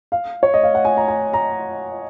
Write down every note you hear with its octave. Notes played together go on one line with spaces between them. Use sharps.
F5
C#5
D#5
F5
F#5
G#5
A#5
G#5
A#5